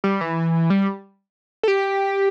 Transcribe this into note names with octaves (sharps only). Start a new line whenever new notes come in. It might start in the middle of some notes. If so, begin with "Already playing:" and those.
G3
E3
G3
A4
G4